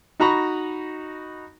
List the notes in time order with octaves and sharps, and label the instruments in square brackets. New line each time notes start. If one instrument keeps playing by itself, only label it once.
[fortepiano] D#4 F#4 A#5 B5 C#6